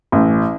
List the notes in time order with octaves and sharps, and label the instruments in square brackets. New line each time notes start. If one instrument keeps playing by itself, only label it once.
[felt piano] A1